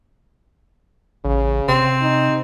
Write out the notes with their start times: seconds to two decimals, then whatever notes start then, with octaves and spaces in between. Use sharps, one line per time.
1.25 A1 C#3
1.68 C3 C4
2.02 D#4